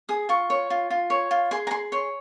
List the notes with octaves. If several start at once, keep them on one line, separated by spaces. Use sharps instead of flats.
G#4 D#6
F4 C#6
C#5
F4
F4
C#5
F4
G#4 C6
A#5
G#4 C6
C#5 C6